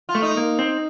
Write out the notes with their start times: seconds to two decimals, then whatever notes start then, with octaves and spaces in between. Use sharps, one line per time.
0.09 F4
0.15 A3
0.22 D#4
0.37 A#3
0.59 C4